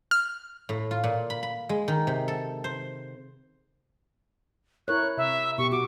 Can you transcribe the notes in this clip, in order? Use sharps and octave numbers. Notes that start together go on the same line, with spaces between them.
F6
A2
F4
A#2
B5
B5
G#3
D#3
C3
A4
C5
E4 A#4 C#5 F#6
C3 E5
B2 G4 C#6
F#4 D6